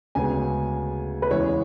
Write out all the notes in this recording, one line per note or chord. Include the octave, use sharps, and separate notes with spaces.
D2 C#3 G#3 B3 G#5
B4
E2 C#3 E3 G#3 B3 C#5